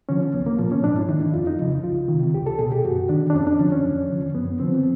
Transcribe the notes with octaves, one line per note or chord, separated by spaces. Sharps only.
D3 F3 C#4
C2 B3
A#3
A#2 F3
C#4
G#2 D4
E4
D#3 D#4
E4
F2 F4
D#4
C#3 F3
C2 F4
C3 D#3
C#2 G4
A4
B2 G#4
G4
F#2 F#4
D#3 D4
D4
F2 C#4
D4
D3 F3 C#4
C#4
F2
D3 F3
F#2 B3
D3 F3 C4